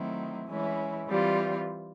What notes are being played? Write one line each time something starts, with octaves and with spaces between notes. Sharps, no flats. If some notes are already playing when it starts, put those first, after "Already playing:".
Already playing: D#3 F#3 A3 C4 E4
E3 G#3 C#4 E4
E3 G3 C4 F4